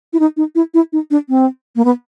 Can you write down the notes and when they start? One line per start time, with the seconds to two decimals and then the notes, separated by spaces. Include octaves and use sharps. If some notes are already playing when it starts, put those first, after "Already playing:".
0.13 E4
0.20 D#4
0.37 D#4
0.55 E4
0.74 E4
0.93 D#4
1.11 D4
1.29 C4
1.76 A#3
1.85 B3